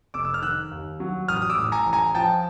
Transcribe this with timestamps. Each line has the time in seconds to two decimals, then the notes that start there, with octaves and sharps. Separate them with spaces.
0.14 F1 D6 E6
0.25 E6
0.34 F6
0.42 D#3 E6 F#6
0.71 D#2
1.00 F#3
1.28 A1 D#6 F6
1.42 D#6
1.50 D6 E6
1.58 A2
1.72 G#5 A#5
1.86 A1
1.93 G#5 A#5
2.14 F3 G5 A5